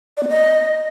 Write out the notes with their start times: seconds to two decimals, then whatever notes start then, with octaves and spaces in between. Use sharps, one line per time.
0.17 D5
0.23 B3
0.29 D#5